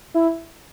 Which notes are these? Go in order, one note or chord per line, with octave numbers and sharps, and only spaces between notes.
E4